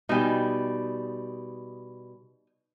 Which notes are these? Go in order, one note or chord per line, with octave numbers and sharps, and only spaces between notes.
B2 G3 D#4 G#5